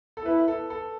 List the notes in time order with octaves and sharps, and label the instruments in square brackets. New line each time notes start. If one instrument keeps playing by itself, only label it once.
[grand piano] A4
[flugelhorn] E4 [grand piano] B4
[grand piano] A4
A4